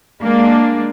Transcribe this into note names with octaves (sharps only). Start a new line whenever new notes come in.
G#3 A#3 D4